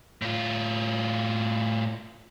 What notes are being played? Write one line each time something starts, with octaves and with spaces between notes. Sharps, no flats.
A2 F4